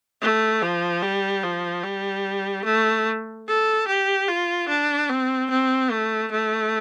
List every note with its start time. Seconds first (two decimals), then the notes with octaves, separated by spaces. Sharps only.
0.21 A3
0.62 F3
1.02 G3
1.44 F3
1.84 G3
2.65 A3
3.47 A4
3.87 G4
4.28 F4
4.68 D4
5.09 C4
5.50 C4
5.91 A3
6.31 A3